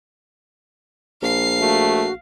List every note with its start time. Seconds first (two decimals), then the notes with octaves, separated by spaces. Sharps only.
1.22 A#1 F5 C7
1.60 A3 F#4